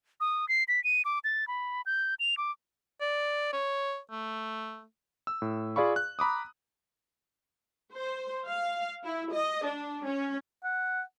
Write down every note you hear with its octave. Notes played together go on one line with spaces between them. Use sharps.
D#6
C7
B6
D#7
D6
A6
B5
G6
F7
D6
D5
C#5
A3
E6
A2
F4 G#4 D5 F5 B5 C#6
F#6
A#5 B5 D6 D#6
C5
F5
E4
D#5
D4
C#4
F#5